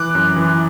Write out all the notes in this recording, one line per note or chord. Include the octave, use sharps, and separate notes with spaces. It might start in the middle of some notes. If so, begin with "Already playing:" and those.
Already playing: E3 D6 F#6
F#2
E3